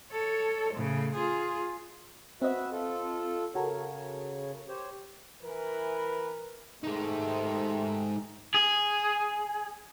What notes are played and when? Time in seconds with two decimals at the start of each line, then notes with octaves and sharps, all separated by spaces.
0.12 A4 C#5
0.73 A2 C#3
1.14 F4 G#4
2.42 C4 F#4 B4 D#5 E5
2.72 F4 A4
3.55 C#3 F#4 A4 A#4 C#5
4.69 G4 C5 C#5
5.43 E3 A#4 B4
6.83 C3 D#3 G#3 A3 D#4
8.54 G#4